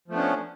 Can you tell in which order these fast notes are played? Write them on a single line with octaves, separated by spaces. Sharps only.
F3 A3 B3 D4 C#4